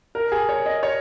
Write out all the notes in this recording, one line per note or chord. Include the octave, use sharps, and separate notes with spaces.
A#4
G#4
C#5
D#5
C#5